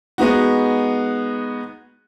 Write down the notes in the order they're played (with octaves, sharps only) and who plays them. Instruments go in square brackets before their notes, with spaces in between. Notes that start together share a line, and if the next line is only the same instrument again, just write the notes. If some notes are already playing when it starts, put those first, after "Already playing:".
[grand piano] G#3 B3 D#4 F#4